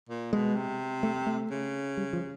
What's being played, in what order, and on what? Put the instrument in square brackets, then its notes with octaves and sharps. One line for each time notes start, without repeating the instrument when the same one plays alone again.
[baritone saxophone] A#2
[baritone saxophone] B2 [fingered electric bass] G#3
[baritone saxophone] C3
[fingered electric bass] A3
A3
[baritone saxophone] C#3
[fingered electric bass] G3
F3